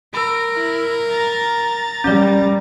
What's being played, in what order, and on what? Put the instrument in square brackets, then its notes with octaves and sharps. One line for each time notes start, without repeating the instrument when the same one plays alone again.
[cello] A#4 [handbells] B5 E6 [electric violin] D7
[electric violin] E4
A#5 A6
[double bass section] G3 [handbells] C#4 D5